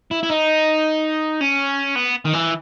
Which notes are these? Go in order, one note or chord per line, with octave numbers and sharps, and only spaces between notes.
E4
E4
D#4
C#4
B3
D#3
E3